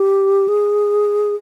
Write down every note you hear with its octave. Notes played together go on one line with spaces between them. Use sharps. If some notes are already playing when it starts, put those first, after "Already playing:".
Already playing: G4
G#4